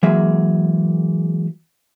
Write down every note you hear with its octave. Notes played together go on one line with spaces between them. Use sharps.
E3 F#3 G#3 A#3 G#4 E5